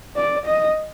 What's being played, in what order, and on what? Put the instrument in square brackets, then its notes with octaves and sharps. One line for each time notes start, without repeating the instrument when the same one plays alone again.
[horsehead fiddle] D5
D#5